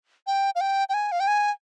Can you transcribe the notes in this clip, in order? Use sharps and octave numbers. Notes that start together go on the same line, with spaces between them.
G5
F5
G5
G5
G#5
F5
G5
G#5